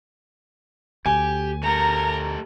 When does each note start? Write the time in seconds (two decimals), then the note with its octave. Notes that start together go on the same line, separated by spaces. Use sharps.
1.06 D2 G4 G#5
1.63 A3 G4 A4 A#4 A#5